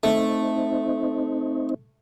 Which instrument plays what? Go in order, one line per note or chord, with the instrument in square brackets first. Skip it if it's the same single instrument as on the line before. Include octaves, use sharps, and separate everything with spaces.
[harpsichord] A3 [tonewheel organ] C4 D#4